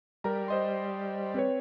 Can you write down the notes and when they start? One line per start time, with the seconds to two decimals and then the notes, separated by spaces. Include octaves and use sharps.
0.24 G3 A#4 A#5
0.48 C5 D#5 C6
1.34 C4 B4 C#5